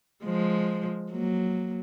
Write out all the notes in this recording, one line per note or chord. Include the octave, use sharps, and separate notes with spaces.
F3 G#3
F#3 A#3